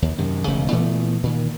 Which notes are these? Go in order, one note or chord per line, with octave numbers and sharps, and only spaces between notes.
D#2
F#2 C3 D#3
E1 D2 C#3 A3
A#2 E3 A3 B3
A#2 D#3